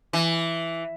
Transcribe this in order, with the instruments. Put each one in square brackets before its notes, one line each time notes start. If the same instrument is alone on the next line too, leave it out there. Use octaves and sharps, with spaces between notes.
[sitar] E3